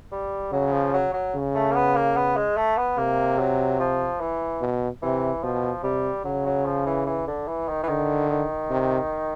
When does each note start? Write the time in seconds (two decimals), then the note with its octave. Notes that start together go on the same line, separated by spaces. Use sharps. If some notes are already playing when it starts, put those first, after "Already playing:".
0.12 G3
0.52 C#3 F#3
0.73 F3
0.94 F#3
1.14 F#3
1.35 C#3
1.55 A3
1.71 A#3
1.75 B3
1.96 A#3
2.16 B3
2.36 G#3
2.57 A3
2.78 B3
2.98 C3 A#3
3.39 F#3
3.80 F3
4.20 E3
4.61 B2
5.02 C3 E3
5.43 B2 F3
5.83 C3 G3
6.25 C#3 F#3
6.46 F#3
6.66 F3
6.86 E3
7.07 E3
7.27 D3
7.48 E3
7.68 D#3
7.83 E3
7.88 D3 D#3
8.30 D#3
8.70 C3